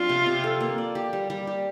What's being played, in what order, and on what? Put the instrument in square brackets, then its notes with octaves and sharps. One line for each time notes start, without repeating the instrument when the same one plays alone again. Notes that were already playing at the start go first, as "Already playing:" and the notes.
Already playing: [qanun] F3 C4 D4 [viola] F4
[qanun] C3
C3
A4
A#3
D5
G4
G3
G3
G4